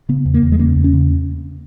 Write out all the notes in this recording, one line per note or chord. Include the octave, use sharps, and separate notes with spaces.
C#3 B3
E2
A#3
E2
G#3
C#3 A#3
E2
C#4
C#3